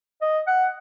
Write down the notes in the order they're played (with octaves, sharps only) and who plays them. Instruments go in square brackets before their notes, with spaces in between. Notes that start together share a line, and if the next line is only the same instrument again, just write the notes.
[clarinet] D#5
F#5